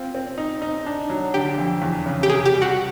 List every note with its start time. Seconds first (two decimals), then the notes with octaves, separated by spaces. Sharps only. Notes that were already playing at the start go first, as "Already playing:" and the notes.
Already playing: C4 F4
0.15 C4
0.38 D#4
0.62 D#4
0.86 D4
1.10 F#3
1.34 D3 G4
1.58 F2
1.82 E2
2.06 C#3
2.23 G4
2.29 C3 G#4
2.45 G4
2.54 G3
2.62 F#4